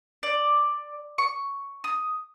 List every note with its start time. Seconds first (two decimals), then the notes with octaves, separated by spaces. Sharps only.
0.23 D5
1.18 C#6
1.84 D#6